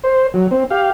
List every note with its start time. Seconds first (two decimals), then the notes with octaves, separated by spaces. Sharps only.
0.04 C5
0.34 F#3
0.51 C4
0.70 G4 F5